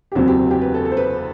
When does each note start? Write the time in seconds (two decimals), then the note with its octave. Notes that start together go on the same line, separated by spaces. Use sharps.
0.12 G4
0.15 F#1 E2 C3 F#3 C4 F#4
0.28 G4
0.51 G4
0.62 B4
0.74 A4
0.85 A4
0.92 C5
0.97 B4